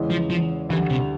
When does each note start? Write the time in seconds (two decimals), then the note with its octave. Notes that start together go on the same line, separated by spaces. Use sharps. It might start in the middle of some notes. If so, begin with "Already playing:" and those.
Already playing: E2 C#3 E3 G#3 C#4
0.10 F3
0.30 F3
0.69 D2 D3 E3 G3
0.90 C3